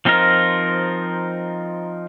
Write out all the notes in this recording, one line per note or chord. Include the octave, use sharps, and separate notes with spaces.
F3 C4 D#4 F4 A#4